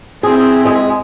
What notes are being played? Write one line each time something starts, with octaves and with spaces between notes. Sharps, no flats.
C4 E4 G#4
G#3 G#4